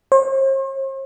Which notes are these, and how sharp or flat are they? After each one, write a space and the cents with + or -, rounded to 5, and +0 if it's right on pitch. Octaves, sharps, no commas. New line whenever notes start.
C5 +45